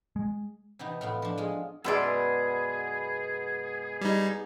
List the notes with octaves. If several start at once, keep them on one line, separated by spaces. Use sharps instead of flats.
G#3
C3 E3 B3 D#4
A2 B3 F4
F3 D4
G#3 F4 G#4
F#2 B2 G#3 B3 G#4 D5
G3 D#4